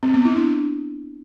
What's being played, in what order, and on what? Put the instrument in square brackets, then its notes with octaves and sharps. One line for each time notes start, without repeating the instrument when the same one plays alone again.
[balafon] C4
B3
E4
D4